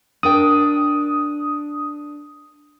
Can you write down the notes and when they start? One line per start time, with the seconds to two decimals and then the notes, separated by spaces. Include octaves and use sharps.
0.23 D4 A#4 G5 D#6